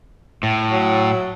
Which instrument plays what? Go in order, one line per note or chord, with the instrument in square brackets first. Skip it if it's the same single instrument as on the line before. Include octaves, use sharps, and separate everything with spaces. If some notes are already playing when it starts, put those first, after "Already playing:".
[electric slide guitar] A2
[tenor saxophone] F#3